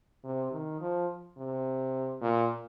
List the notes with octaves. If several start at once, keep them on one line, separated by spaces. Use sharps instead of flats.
C3
D#3
F3
C3
A#2